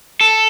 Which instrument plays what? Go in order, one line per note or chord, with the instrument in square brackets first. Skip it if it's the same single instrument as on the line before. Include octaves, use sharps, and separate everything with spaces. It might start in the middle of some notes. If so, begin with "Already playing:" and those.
[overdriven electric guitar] A4